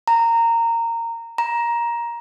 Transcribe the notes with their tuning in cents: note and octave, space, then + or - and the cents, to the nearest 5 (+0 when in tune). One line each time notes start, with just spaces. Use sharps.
A#5 -15
A#5 +15